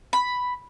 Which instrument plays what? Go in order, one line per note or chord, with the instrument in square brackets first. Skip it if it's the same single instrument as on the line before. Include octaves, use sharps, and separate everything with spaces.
[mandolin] B5